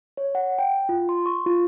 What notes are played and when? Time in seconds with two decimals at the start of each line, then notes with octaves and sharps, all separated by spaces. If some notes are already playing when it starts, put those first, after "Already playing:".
0.17 C#5
0.35 F#5
0.59 G5
0.89 F4
1.09 C6
1.26 C#6
1.46 F4